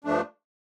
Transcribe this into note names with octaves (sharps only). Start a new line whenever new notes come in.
G2 F3 A3 D4